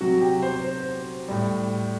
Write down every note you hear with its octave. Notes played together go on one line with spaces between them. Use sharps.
C3 F#3 F#4
G4
C5
C5
A2 G3